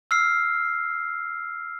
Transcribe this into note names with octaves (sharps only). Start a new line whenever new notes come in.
E6 F6 C7